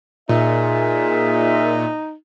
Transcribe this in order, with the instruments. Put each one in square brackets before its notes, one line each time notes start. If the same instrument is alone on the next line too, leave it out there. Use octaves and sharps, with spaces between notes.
[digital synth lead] A#2 [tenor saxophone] D#4 [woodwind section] G#4 A#4 E5